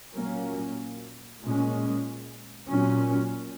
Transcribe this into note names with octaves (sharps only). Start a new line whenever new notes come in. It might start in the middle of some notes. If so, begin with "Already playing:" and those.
A#2 F#3 A#3 C#4
A#2 G#3 C#4
A#2 F#3 C#4